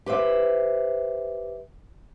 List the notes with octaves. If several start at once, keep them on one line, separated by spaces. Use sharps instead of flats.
G4 B4 C5 E5